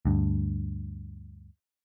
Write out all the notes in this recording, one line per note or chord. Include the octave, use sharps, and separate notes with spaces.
D2 G2